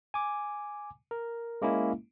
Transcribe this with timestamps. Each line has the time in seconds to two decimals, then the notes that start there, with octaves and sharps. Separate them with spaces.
0.14 G#5 D6
1.11 A#4
1.62 G#3 A#3 C#4 E4